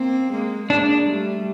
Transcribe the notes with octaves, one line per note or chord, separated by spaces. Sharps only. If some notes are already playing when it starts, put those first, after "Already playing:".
Already playing: A#3 C4
G#3 A#3
G#3 A#3 D4
G3 A3